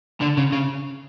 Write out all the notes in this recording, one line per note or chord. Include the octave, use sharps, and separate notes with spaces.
D3
C#3
C#3